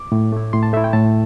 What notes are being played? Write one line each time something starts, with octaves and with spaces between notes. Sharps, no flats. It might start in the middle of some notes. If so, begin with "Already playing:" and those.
Already playing: D6
A2
A3 E4
A2 C6
A5
A3 E4 E5
G5
A2 A5